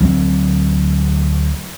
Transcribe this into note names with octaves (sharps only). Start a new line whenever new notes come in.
D2 F#3 C4